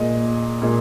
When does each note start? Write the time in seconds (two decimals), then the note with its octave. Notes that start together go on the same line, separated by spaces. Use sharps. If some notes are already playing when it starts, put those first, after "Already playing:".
Already playing: A#2 G#3 D#5
0.62 A#2 G#3